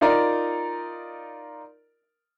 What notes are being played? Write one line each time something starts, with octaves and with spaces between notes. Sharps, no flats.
D#4 F4 A#4 D5 A#5